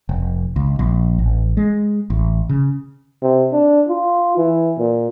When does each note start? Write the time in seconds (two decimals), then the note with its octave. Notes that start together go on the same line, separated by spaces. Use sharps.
0.09 F1
0.56 C#2
0.79 A#1
1.19 A1
1.57 G#3
2.10 A1
2.49 C#3
3.22 C3
3.52 D4
3.88 F4
4.37 E3
4.78 A#2